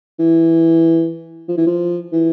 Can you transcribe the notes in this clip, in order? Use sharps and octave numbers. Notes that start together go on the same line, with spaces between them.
E3
F3
E3
F3
E3